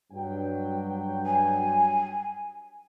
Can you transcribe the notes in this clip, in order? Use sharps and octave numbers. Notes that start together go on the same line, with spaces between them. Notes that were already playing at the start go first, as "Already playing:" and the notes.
G2 F#3 G5
G#5